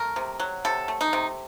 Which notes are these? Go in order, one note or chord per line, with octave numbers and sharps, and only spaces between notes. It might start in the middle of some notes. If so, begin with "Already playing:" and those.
Already playing: A3 A#4
C3
F#3
C3 A4
A3
D#4
C3